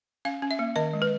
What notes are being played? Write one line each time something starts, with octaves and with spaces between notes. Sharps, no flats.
C#4 F5
C#4
E5
A#3
D#3 D#5
G#3
B4